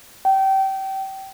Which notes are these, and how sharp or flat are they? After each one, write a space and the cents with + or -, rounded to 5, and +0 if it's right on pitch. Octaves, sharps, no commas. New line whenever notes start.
G5 -25